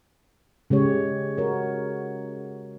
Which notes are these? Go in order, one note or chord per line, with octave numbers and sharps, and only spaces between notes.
C#3 G#3 G4 C#5
F#4 A#4 C#5